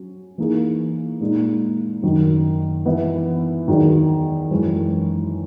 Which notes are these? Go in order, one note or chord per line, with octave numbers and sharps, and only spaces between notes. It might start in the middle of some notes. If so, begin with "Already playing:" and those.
Already playing: F#3 C#4
E3 A#3 D#4 G#4
A#2 G#3 D#4
F#2 D#3 F#3
E3 B3 E4
E2 D#3 F#3
F#2 E3 G#3 C#4